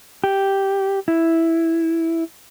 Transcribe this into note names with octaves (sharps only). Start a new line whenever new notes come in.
G4
E4